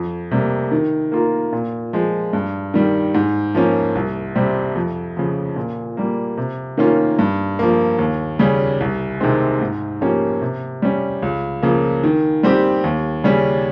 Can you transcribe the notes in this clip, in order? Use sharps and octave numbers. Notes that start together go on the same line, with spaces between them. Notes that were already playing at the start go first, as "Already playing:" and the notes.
Already playing: F2
C3 G3 A#3
D#3
A#3 F4 A#4
A#2
F3 G#3
G2
D#3 G3
G#2
F3 A#3 C#4
C2
C3 G3 C4
F2
C#3 F3
A#2
G3 A#3
C3
D#3 A#3 C#4 F4
G2
F3 A#3
D#2
C#3 G3 C#4
C2
C3 D#3 G#3 C4
G#2
F3 A#3 C#4 G4
C3
G3 C#4
C#2
C#3 F3 A#3
D#3
G3 C4 G4
D#2
C#3 G3 C#4